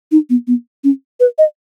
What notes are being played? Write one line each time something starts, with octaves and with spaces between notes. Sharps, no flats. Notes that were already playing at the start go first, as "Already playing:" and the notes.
D#4
B3
B3
C#4
B4
D#5